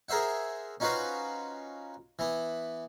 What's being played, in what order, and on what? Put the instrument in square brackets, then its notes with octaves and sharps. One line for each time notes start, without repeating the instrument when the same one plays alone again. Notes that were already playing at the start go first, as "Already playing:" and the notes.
[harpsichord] G#4 A#4 C5 E5 F#5
C#4 D#4 F4 F#4 B4 C5
E3 B3